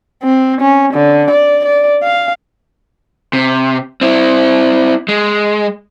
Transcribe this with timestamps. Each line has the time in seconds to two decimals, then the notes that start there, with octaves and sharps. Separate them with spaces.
0.23 C4
0.60 C#4
0.93 D3
1.30 D5
1.65 D5
2.02 F5
3.33 C3
4.01 C4 E4
5.08 G#3